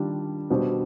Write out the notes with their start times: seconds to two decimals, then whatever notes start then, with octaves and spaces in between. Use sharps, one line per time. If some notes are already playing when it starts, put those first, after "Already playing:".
Already playing: D#3 G3 D4 F4
0.50 B2 G3 D4 G4 C5